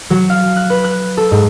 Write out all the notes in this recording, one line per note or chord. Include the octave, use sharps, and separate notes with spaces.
F#3
F5
F#6
B4
F#6
A4
G#2